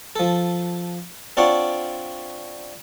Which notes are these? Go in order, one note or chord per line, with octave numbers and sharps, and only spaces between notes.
F3 A4
C4 D4 F4 C#5 D5 F#5